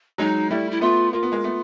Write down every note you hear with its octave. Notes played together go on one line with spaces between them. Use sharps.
F#3 G#3 D#4
G3 A3 E4
E4
A3 B3 F4
A#3 F4
B3
G#3 A#3
A3 B3